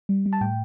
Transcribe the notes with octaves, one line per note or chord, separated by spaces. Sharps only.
G3
G3
A5
A2 G5